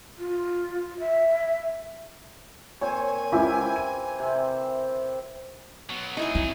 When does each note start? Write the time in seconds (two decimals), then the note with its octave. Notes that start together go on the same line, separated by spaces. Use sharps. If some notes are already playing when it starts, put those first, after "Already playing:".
0.17 F4
0.99 E5
2.81 A#2 C4 C5 C#5 G#5
3.32 C#2 E3 C#4 E4 G4
3.76 D#7
4.19 C3 C4
5.90 F#3 B3
6.17 F#3 D#4 E4 G#4 G#5
6.35 C4 E4